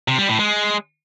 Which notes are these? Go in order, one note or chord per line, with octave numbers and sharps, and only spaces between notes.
C3
G3
A2
G#3